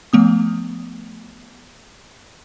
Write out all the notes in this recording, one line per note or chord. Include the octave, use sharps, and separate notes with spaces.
F3 A3 B3 D#6